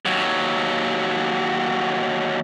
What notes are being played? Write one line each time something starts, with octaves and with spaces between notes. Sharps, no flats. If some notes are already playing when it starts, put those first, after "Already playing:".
D#2 F#3